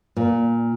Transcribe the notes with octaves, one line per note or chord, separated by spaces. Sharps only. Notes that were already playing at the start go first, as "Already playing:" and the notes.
A#2